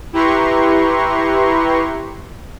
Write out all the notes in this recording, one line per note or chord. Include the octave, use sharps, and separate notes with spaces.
E4 G4 B4 A#5 C6 C#6